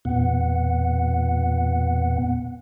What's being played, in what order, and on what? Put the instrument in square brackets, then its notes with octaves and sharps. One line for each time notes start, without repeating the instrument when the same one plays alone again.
[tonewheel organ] E2 A#2 B3 F#5